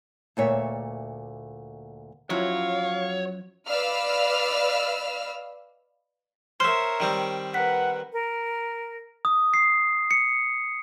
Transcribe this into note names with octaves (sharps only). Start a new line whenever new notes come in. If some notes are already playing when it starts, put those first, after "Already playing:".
D2 A#2 C#5 E5
F#2 F3 F#3 E4 C#5 F5
B4 D5 D#5 F5 E6 F6
A#4 C5 C#5 E5 C6 F6
D#3 G3 C4
A#4 B4 F#5 B6
A#4
D#6
C7
C#7